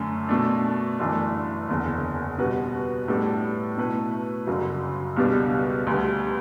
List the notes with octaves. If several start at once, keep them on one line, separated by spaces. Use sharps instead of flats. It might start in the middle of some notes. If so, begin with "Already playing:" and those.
Already playing: F#2 D3 A3 C#4
B2 A3 D4
G1 F#2 E3 A3 D4
F#1 E2 D3
B2 G3 B3 F#4 B4
A2 G3 B3 D4 A4
B2 A3 E4 B4
G1 F#2 C#3 F#3
C#2 B2 G3 B3 D4
D2 D3 G3 B3